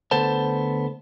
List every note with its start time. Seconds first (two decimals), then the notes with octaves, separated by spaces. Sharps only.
0.11 D2 B3 A4 C5 A5